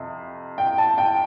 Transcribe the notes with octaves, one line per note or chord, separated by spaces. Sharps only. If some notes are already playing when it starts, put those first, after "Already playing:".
Already playing: F2 C3
G5
A5
G5